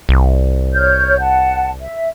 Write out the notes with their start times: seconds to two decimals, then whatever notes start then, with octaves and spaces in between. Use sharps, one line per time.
0.09 C2
0.74 C#5 F6 G6
1.20 F#5 A5
1.81 E5